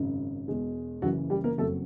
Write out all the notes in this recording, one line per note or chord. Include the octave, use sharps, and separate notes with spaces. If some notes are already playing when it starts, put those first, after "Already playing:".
Already playing: G#1 F#2 C#3
E1 E2 B2 G#3
F#1 F#2 C#3 E3 F#3 F#4
G3 G4
A#3 A#4
F#1 F2 C#3 F#3 A3 A4